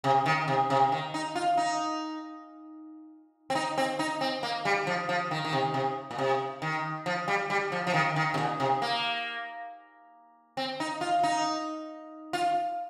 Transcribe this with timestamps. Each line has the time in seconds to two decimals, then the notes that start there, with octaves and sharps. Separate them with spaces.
0.04 C3
0.26 D#3
0.48 C3
0.70 C3
0.92 D#3
1.14 D#4
1.35 F4
1.57 D#4
3.50 C4
3.55 D#4
3.78 C4
3.99 D#4
4.21 C4
4.43 A#3
4.65 G3
4.87 F3
5.09 F3
5.31 D#3
5.45 D#3
5.53 C3
5.74 C3
6.11 A#2
6.18 C3
6.62 D#3
7.06 F3
7.28 G3
7.50 G3
7.72 F3
7.87 F3
7.94 D#3
8.16 D#3
8.34 C3
8.38 A#2
8.60 C3
8.82 A#3
10.57 C4
10.80 D#4
11.01 F4
11.23 D#4
12.33 F4